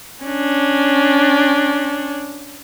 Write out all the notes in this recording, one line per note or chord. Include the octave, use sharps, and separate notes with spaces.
C#4 D4